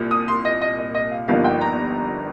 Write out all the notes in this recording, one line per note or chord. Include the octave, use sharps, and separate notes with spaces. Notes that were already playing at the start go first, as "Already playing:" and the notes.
Already playing: C2 A#2
D#6
C6
D#5
D#5
D#5
D#5
F5
G1 G2 F3 A#3 D#4 F5
G5
A#5